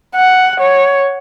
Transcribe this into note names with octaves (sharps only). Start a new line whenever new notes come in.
F#5
C#5